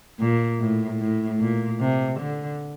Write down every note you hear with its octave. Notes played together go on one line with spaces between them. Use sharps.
A#2
A2
A2
A#2
C3
D3